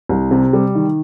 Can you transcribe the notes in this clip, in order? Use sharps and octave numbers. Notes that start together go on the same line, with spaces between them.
C2
C3
G3
D#3